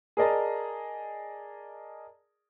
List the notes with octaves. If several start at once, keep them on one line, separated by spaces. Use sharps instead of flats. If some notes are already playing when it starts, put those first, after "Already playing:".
G#4 A#4 D5 D#5 A5 A#5